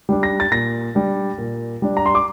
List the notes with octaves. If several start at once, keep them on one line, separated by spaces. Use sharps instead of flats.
G3 D4
A#6
A6
A#2 A#6
G3 D4
A#2
G3 D4
A#5
C6
D6